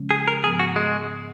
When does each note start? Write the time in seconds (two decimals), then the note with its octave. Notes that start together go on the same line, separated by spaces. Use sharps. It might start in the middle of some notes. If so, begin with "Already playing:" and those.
Already playing: C#3 F3 G#3 C#4
0.11 G#4
0.28 A#4
0.44 G#2 F3 B3 G#4
0.59 F#4
0.76 G#3